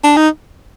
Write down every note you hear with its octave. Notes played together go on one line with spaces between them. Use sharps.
D4
D#4